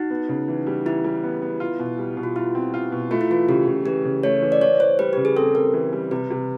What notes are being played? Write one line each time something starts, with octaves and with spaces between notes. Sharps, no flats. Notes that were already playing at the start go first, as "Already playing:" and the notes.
Already playing: D#4 F#4
B3
C#3
E3
G3
E3 E4
G3
B3
B3
F4
B2
G3
B2
F4
E4 F4
C4
F4
B2
A3 F4
E4
E3 F4
C#3 G4
C#3
E3 G4
C#3
A3 C#5
E3
D5
E3 C#5
E3 C5
G3 B4
C#3 G4
G#4
C4 A4
C4 A#4
E3
G3
C3 B4
C3